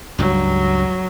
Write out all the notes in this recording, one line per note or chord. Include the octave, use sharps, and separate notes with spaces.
C#2 G2 F#3 G3